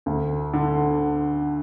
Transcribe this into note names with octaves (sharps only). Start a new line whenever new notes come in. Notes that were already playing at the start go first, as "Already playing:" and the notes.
D2
D3